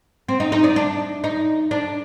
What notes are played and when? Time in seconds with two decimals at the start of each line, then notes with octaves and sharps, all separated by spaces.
0.29 C4
0.40 D#4
0.52 D#4
0.64 D4
0.76 D4
1.24 D#4
1.71 D4